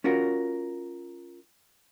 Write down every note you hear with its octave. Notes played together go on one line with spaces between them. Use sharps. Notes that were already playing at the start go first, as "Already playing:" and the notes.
C#4 F4 F#4 A#4